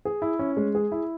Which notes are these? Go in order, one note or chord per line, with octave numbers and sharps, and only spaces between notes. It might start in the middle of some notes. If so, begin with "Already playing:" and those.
G#4
E4
C#4
G#3
G#4
E4